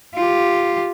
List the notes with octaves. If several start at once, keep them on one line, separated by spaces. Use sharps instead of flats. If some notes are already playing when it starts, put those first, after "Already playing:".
F4 G4